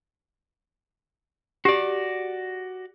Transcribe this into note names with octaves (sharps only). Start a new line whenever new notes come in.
F#4 G4 D5